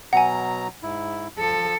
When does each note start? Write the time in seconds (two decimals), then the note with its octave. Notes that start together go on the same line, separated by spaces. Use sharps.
0.13 B2 F#3 F#5 G#5 A#5
0.83 G#2 E4
1.39 F3 A4